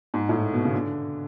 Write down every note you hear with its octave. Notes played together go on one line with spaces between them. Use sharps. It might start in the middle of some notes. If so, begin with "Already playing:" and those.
G#2
A2
B2
C#3
D3